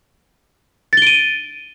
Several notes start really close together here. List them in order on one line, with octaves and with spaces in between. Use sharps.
A6 G7 D7 D#7